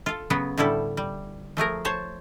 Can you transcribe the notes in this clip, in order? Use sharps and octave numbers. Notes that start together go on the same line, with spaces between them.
F4 A4
C#3 F#3 B3
A2 D3 G3 E4 A4
G3
F3 A3 G#4 A#4
C5 C#5 A5